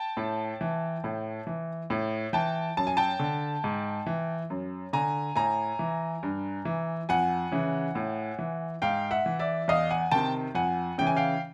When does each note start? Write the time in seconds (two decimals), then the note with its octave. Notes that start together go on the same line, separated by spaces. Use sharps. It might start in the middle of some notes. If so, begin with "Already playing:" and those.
Already playing: G5 A5
0.17 A2
0.61 E3
1.04 A2
1.47 E3
1.90 A2
2.33 E3 G5 A5
2.77 F#2 A5
2.87 G#5
2.97 G5 A5
3.19 D3
3.64 G#2
4.06 E3
4.50 F#2
4.93 D3 G#5 A#5
5.36 A2 G#5 A#5
5.79 E3
6.23 G2
6.65 E3
7.09 F2 F#5 G#5
7.52 C#3 E3
7.95 A2
8.39 E3
8.82 G#2 F5 G5
9.11 E5 F#5
9.26 E3
9.39 D5 E5
9.68 E2 D#5 F5
9.90 F#5 G#5
10.11 C3 D#3 G5 A5
10.55 F2 F#5 G#5
10.98 C#3 E3 G5
11.07 G#5
11.17 F5 G5